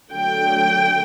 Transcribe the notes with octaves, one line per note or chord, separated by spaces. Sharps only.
D3 F#3 A3 G5